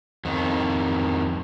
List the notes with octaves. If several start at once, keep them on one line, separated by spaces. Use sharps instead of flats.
F2 D#3